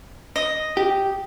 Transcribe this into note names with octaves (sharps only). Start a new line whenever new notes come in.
D#5
G4